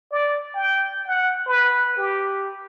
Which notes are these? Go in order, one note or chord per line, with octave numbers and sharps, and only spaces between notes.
D5
G5
F#5
B4
G4